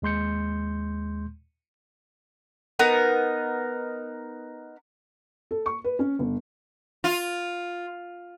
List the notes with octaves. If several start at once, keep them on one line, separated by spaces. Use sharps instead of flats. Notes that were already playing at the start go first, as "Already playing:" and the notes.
D#2 G#3 C6 G6 C#7
B3 D#4 A#4
A4
C#6
B4
C#4
G1
F4